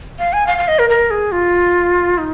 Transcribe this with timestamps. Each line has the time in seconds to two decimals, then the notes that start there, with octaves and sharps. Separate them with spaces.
0.19 F5
0.33 G#5
0.47 F5
0.58 F5
0.68 D#5
0.79 A#4
0.90 A#4
1.11 G#4
1.32 F4
2.18 D#4